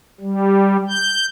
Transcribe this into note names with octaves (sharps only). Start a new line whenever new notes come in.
G3
G6